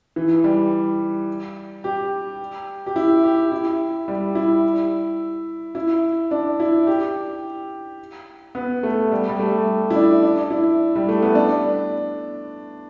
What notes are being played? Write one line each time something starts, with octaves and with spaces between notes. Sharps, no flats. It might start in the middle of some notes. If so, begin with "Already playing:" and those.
E3
G3
G4
G4
E4
G4
E4
G3
E4
E4
D4
E4
G4
B3
A3
G3
G3
A3
E4
D4
D4
E4
G3
A3
B3
D4